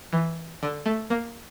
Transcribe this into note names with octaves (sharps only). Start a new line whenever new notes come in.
E3
D3
A3
A#3